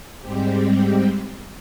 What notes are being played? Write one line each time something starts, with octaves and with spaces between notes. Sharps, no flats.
G#2 G3 G#3 C4 G4